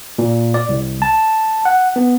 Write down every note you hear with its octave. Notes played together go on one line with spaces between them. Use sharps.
A#2
D5
C2
A5
F#5
B3